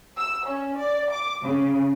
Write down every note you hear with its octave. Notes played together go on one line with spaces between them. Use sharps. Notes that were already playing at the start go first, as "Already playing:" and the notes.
E6
C#4
D5
D6
C#3